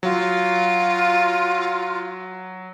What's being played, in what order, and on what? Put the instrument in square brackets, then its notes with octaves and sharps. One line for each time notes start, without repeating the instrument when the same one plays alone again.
[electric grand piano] F#3 [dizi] F4